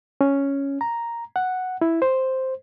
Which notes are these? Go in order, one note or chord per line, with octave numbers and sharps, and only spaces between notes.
C#4
A#5
F#5
E4
C5